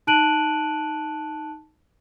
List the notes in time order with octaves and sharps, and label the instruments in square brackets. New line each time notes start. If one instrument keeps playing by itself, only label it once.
[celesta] D#4 A5 F#6 D7 D#7 F#7